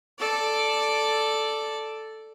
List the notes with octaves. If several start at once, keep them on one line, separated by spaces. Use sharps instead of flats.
A4 D5